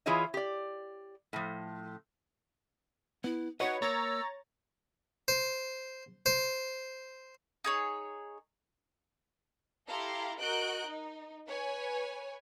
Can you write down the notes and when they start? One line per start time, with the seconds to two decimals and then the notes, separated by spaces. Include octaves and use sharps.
0.06 E3 E4 F4 G#4 C#5 D#5
0.34 G4 D5
1.33 A2 F3
3.24 B3 E4
3.60 D#4 F#4 B4 C#5 D#5 F#5
3.82 A#3 C#5 A#5 E6 A6
5.28 C5
6.26 C5
7.64 D#4 G#4 C#5
9.88 E4 G4 A4 F5 A#5 C6
10.40 F#4 A#4 D#5 F#6 G6 D7
10.88 D#4
11.47 B4 C#5 G#5